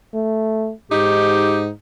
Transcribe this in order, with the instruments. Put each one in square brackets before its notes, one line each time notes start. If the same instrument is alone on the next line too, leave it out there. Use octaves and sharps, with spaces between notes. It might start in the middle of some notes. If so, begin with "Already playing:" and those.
[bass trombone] A3
[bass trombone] G#2 [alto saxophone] D#4 [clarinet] G4